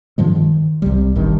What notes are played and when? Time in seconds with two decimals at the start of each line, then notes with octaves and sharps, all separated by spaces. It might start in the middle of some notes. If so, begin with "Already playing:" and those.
0.18 G2 D#3 F3 G#3
0.36 D#3
0.82 C2 C3 G3
1.15 G1 G2 D#3